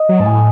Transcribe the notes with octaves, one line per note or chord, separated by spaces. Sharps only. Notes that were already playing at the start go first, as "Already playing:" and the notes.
Already playing: D#5
F#3
G#2 A5
A2 G#5